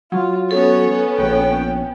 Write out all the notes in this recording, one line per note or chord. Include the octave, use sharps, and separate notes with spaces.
F#3 F4
B3 C#4 A4 C#5
A#1 G5